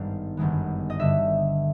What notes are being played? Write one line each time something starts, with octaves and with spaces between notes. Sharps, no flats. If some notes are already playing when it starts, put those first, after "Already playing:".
Already playing: G#1 G2 D#3 G3 B3 F5
G1 F#2 D#3 G#3 B3
D#5
G2 D3 G3 E5